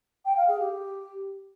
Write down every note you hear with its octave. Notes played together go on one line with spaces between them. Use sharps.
G5
F5
G#4
G4